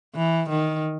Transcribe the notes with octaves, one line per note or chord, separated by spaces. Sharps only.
E3
D#3